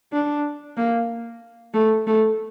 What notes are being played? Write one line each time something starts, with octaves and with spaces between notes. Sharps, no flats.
D4
A#3
A3
A3